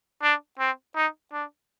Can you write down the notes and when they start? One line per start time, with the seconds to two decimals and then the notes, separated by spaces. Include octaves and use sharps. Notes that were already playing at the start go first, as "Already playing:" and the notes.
0.22 D4
0.60 C4
0.96 D#4
1.33 D4